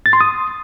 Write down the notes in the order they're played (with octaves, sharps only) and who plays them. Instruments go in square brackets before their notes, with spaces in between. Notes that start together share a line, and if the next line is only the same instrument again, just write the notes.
[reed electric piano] A6
C6
D#6